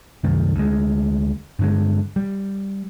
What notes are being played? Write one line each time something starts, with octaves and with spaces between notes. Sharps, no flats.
C2 F#2 D#3 A3
D2 G#3
G2 D3 G#3
G3